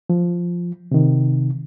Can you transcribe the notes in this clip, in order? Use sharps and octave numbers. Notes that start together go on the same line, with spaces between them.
F3
C3 D#3